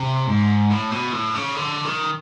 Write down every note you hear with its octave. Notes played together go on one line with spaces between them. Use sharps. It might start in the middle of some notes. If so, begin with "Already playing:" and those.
Already playing: C3
G#2
A2
B2
A2
C#3
D3
D#3